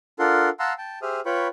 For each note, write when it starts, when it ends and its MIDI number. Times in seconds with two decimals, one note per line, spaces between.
0.19 0.49 62
0.19 0.49 65
0.19 0.49 69
0.19 0.49 70
0.19 0.49 78
0.19 0.49 84
0.59 0.73 77
0.59 0.73 78
0.59 0.73 81
0.59 0.73 82
0.59 0.73 84
0.59 0.73 88
0.78 0.99 79
0.78 0.99 81
1.02 1.20 67
1.02 1.20 68
1.02 1.20 72
1.02 1.20 76
1.02 1.20 87
1.02 1.20 89
1.26 1.48 65
1.26 1.48 71
1.26 1.48 73
1.26 1.48 79
1.26 1.48 83
1.26 1.48 85